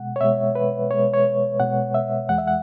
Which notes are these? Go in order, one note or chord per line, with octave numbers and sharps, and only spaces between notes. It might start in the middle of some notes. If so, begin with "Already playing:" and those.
Already playing: B2 G#3 F#5
C#5
B2 G#3 E5
B4
B2 G#3 C#5
C#5
B2 G#3 F#5
E5
E2 E3 G#3 F#5
E5
F#5